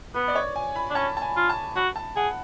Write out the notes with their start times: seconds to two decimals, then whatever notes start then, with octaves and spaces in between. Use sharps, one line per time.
0.14 B3 B4
0.28 D5
0.35 C#5
0.56 G#5
0.76 B5
0.90 D4
0.95 C#4 A5
1.17 A5
1.22 G#5
1.36 F4
1.49 A5
1.76 F#4 B5
1.96 A5
2.16 G#4 F#5